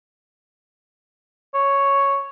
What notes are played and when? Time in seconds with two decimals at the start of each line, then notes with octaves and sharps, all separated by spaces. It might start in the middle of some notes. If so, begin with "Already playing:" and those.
1.54 C#5